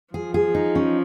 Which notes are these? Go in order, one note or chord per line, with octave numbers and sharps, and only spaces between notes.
F3 G#4
G#4
D#4
C#4